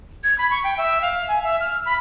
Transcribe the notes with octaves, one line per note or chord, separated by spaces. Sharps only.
G#6
B5
C#6
G5
E5
F5
G#5
E5
F6
B5